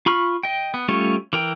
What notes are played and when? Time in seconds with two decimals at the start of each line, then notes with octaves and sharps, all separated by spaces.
0.06 F4 B5 C#6 F6
0.43 D#5 G5
0.74 B3
0.88 G3 A3 C#4 F4 C#5
1.33 E3 A#4 G5